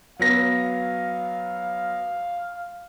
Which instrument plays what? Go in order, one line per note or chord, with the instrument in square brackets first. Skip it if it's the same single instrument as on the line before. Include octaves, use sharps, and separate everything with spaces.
[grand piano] F#3 B3 A#6 [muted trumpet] F5